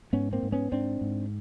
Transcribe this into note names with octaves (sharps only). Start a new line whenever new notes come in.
G#2 B3 C#4
A#3 C4
G#2
B3 C#4
G#2 C4 D4
G#2